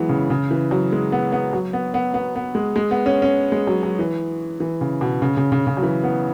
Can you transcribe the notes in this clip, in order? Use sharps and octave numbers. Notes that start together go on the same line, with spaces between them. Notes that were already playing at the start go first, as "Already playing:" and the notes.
Already playing: E3 F#3 G#3 B3
C#3
C#3
E3
F#3
G#3
B3
B3
F#3
B3
B3
B3
B3
G#3
G#3
B3
C#4
C#4
G#3
F#3
F#3
E3
E3
C#3
B2
C#3
C#3
C#3
C#3
F#3
E3
B3